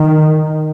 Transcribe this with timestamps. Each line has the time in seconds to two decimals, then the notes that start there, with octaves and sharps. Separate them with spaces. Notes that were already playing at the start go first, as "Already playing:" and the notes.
Already playing: D#3